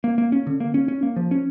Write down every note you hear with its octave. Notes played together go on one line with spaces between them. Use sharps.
A#3
A#3
C#4
D3
A#3
C#4
C#4
A#3
F3
C#4